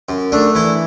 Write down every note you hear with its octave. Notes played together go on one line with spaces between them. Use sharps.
F#2
A3 D4
E3 E4